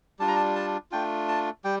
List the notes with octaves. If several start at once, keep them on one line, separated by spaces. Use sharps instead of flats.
G3 D4 F4 A5
A#5
A5
A5
A3 D4 F4 G5
A5
G3 G5